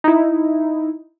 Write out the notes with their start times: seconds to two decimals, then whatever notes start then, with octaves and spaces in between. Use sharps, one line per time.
0.04 D#4 E4